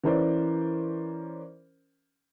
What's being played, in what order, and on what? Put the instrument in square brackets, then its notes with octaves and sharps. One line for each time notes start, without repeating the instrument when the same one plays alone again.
[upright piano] E3 C#4 A#4 C5 D5